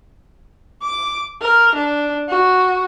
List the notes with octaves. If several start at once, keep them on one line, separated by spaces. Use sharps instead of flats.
D6
A#4
D4
F#4